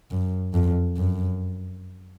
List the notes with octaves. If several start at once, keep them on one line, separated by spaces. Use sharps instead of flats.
F#2
F2
F#2